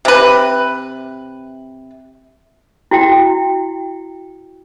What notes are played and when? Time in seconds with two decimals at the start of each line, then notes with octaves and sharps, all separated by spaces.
0.05 C3 B4
2.91 E4 F#4 G5